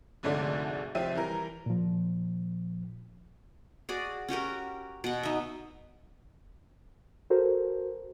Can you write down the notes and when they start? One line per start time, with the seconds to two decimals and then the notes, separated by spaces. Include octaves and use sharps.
0.23 F1 D2 G#2 D3 A3 D5
0.95 F1 F3 C4 G4 E5 D#7
1.15 E3 G3 A#4
1.66 A#2 F3
3.89 F#4 G#4 D5
4.28 C#4 F#4 G4 A#4
5.04 B2 F#5
5.23 D#4 E5
7.30 F#4 A4 A#4 C5